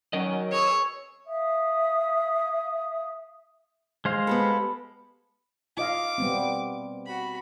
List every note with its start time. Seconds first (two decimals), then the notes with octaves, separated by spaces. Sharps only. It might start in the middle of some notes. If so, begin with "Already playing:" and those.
0.13 F#3 C#4 A#4 D#5
0.52 G#4 C#5 E6
1.27 E5 F5 D#6
4.05 G#3 C5 F5
4.27 B3 G4 A4 B5
5.77 F4 D#5 F5 D6
6.18 G3 B3 C4
7.06 F#4 B5